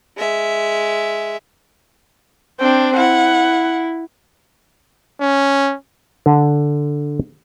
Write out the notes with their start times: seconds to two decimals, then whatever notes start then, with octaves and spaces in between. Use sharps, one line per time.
0.17 G#3 E5
2.59 C4 D4 G5
2.96 E4 F#5
5.21 C#4
6.26 D3